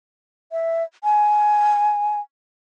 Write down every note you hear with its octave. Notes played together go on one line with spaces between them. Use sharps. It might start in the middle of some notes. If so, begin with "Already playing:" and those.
E5
G#5